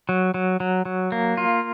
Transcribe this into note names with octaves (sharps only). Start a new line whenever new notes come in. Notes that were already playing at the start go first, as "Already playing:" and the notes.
F#3
F#3
F#3
F#3
A#3
F4